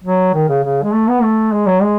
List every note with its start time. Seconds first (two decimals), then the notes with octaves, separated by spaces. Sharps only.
0.04 F#3
0.34 D#3
0.49 C#3
0.64 C#3
0.83 G#3
0.93 A3
1.08 B3
1.22 A3
1.52 G#3
1.67 F#3
1.82 G#3